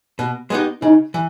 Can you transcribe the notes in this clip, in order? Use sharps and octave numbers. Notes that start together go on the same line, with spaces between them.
B2
G#3 B3 D#4 G4
C#3 D#4
E3